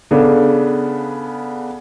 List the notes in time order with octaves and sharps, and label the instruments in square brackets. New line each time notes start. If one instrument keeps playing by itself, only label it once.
[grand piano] C#3 B3 D4 A4